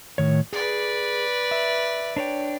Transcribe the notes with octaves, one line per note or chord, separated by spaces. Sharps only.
A2 D#3 C#5
G#4 B4 D5
E5
D4 C#5 G5